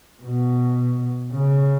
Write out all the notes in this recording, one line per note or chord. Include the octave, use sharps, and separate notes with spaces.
B2
C#3